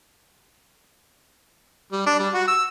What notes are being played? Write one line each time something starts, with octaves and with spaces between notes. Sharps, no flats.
G3
D4
G3
F#4
E6